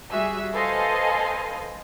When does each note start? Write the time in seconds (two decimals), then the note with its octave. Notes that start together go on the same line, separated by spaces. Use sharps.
0.11 G3 F#4 G#4 E5 E6
0.52 A4 B4 C5 D#5 F5 G#5